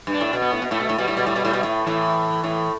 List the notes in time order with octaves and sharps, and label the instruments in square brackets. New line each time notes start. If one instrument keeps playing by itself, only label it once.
[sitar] G2
[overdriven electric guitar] D4
[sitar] A2
B2
[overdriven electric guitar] B3
[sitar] A2
B2
[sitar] A2 [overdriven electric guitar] A3
[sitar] B2
A2
[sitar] B2 [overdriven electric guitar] G3
[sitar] A2
B2
A2
B2
A2
B2
A2
[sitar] A2 [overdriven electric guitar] E3
[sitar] A2